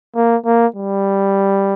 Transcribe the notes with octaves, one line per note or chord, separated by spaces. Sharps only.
A#3
A#3
G3